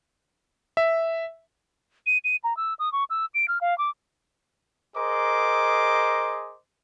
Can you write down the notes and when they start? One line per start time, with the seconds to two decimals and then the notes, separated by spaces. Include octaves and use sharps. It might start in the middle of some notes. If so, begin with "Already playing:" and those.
0.77 E5
2.06 D#7
2.24 D#7
2.44 A#5
2.57 E6
2.79 D#6
2.92 C#6
3.10 E6
3.34 D7
3.48 F6
3.61 F5
3.78 D6
4.97 G#4 A#4 C5 D#5 A#5 D6